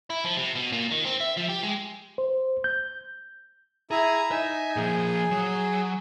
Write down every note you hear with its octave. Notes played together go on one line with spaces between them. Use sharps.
E4
F3
C3
B2
A#2
D#3
C4
E5
F3
G4
G#3
C5
G6
E4 G#4 A#5
D#4 E5 G#5
A#2 F3 G#4
F#3